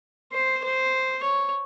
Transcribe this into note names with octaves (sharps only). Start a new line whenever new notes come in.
C5
C5
C#5